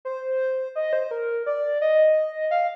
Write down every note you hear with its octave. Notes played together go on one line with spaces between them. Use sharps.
C5
D#5
C5
A#4
D5
D#5
F5